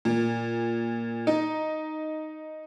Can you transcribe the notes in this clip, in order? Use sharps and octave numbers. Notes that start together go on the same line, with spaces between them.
A#2
D#4